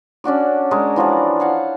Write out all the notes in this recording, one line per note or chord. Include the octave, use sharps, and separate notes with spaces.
C#4 D4 F#4 D5
G#3 D4 A#4 C#5
E3 F3 F#4 D5
C#5 F5 F#5 A5